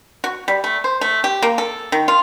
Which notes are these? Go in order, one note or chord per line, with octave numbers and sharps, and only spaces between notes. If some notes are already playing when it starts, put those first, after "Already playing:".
F#4
G3
A3
C5
A3
G4
A#3
A4
D#3
F4